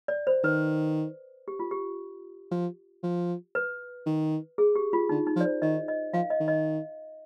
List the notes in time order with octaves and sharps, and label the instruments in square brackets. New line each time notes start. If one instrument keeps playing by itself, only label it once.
[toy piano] D5
C5
[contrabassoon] D#3 [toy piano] B4
[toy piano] G4
F4
G4
[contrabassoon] F3
F3
[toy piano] B4
[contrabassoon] D#3
[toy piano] G#4
G4
F4
[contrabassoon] D3 [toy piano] D#4
[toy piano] D#4
[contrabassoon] F3
[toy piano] D5
C5
[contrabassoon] D#3 [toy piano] D#5
[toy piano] D#5
[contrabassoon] F3 [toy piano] F5
[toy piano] D#5
[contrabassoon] D#3
[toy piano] D#5